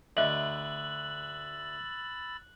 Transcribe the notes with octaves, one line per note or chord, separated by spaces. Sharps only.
D2 D#5 E5 B5 E6 F#6 A6 F#7